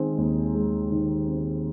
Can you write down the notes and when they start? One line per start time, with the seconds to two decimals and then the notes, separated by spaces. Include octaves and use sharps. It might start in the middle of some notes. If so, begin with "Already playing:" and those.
Already playing: D#3 G#3 C4
0.18 D#2
0.55 G#3
0.91 D#3
1.28 C4